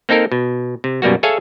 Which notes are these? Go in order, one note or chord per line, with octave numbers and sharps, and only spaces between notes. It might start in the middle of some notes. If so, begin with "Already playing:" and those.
A#3 C4 D#4 A4 A#4
B2
C3
F#2 B2 G3 A#3 F#4
G#4 A4 C#5 E5 F5 G#5